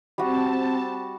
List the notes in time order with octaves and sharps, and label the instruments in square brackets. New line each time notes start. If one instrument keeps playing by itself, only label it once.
[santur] G3 F#4 [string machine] C4 A5